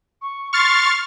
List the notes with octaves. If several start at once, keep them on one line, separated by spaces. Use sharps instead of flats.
C#6
C6 C#6 F6 A6